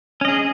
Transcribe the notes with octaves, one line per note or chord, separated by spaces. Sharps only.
C#4 G#4 D#5